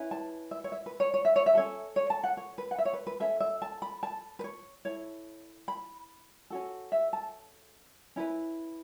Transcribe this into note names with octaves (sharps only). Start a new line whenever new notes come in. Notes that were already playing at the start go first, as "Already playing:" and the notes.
Already playing: C#4 E4 B4
A5
E5
C#5
E5
B4
C#5
C#5
E5
C#5
E5
C#4 A4 C#5
C#5
A5
F#5
C#5
B4
F#5
E5
C#5
B4
B4
C#4 A4 E5
E5
A5
B5
A5
B4
C#5
E4 A4 C#5
B5
C#4 F#4 A4
E5
A5
C#4 E4 B4